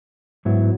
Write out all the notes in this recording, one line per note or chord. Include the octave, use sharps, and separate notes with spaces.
G#2 F#3 B3 E4